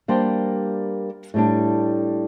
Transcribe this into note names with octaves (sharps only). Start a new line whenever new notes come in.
G3 A#3 D4 G4 C5
A2 G3 D4